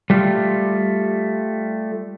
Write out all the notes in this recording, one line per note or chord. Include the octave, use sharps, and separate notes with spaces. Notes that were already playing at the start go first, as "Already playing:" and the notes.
G3 A3 F4